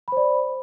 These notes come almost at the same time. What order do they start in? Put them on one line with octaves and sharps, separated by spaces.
B5 C5 D5